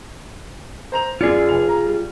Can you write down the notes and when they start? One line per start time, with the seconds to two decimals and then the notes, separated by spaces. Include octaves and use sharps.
0.92 C5 A#5 F7
1.21 F#2 F4 G#4 D5 C#7
1.49 F1 F7
1.69 A#5
1.86 G3